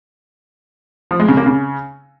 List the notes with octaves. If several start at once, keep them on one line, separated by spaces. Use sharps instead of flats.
F3
G#3
C#3
A#3
C#3